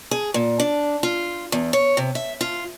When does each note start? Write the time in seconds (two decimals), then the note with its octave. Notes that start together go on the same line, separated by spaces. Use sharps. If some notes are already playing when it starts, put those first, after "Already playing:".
0.11 G#4
0.34 A#2
0.60 D4
1.03 F4
1.52 E2
1.73 C#5
1.97 C3
2.15 E5
2.41 F4